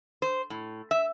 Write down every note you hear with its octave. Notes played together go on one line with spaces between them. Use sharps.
C5
A2
E5